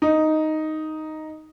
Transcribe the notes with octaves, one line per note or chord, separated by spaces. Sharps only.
D#4